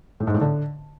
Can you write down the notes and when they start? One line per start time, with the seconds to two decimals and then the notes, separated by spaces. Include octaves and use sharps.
0.20 A2
0.27 G#2
0.34 A2
0.41 D3